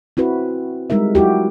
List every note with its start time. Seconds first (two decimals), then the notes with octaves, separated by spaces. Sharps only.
0.17 C4 E4 F#4 B4
0.90 G3 G#3 D#4 A#4 E5
1.15 F#3 E4 F#4 G4